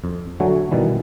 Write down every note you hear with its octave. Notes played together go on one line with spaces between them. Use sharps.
F2
D3 F#3 A3 F#4 G#5
B2 D#3 E3 G3